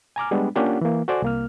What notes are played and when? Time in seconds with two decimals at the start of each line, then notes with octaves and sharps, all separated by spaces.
0.16 G#5 A#5 D6 F6
0.31 G3 G#3 B3 D4
0.56 A#3 C#4 D4 F4 G4 F#5
0.81 E3 A#3
1.08 F#4 A4 C5 D5 G#5
1.22 C2 A#3 F6